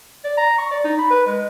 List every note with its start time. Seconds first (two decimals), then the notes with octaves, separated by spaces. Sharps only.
0.24 D5
0.37 A#5
0.58 C#6
0.71 D5
0.84 D#4
0.99 B5
1.11 B4
1.26 G#3